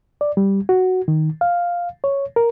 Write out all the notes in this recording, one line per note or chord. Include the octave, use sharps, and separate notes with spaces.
D5
G3
F#4
D#3
F5
C#5
A#4